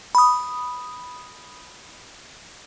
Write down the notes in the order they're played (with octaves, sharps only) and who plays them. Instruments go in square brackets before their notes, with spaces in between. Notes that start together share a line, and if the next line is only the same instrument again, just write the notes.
[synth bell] B5 D#6